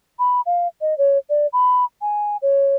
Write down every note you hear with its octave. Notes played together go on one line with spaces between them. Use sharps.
B5
F5
D#5
C#5
D5
B5
G#5
C#5